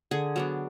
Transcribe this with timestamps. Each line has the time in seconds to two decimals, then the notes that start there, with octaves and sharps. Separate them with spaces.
0.11 D3 G#4
0.36 F#3 B3 D4